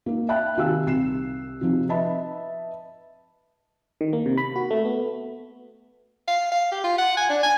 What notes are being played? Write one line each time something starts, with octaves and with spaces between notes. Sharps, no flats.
A#3 D#4
E5 F5 G5 A5 B5 F#6
C3 D#3 G4 F5 G#5 E6
C2 C7 E7
C3 F3 D#4
B4 D#5 E5 A5 B5
D#3
A#3
C3
B5
F#4
A3
B3
F5
F5
G4
F4
F#5
G#5
D4
G#5